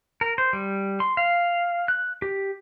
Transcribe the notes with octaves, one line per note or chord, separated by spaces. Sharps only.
A#4
C5
G3
C6
F5
F#6
G4